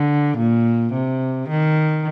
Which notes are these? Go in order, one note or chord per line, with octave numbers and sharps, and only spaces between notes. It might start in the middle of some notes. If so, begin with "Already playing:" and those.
Already playing: D3
A#2
C3
D#3